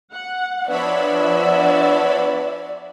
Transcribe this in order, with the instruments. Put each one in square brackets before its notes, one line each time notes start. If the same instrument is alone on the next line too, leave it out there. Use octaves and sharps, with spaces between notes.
[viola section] F#5
[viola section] F3 E5 [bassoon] B3 [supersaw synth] D4 C#5 B5 [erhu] D5